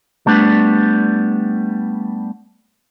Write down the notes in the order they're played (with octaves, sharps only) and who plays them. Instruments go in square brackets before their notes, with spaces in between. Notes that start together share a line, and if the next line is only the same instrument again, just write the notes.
[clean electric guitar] G3 A3 B3 D4